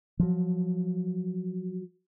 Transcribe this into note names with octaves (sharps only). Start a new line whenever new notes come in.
F3 F#3